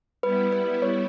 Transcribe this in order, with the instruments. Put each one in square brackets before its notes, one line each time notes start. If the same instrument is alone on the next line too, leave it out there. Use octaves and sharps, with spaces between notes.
[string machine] G3 B3 E4 [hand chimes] B4
[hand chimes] B4
C#5